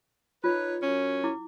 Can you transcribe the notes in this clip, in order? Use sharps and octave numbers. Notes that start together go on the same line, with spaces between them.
D#4 F4 B4 C#5
F#2 C#4
E4 D6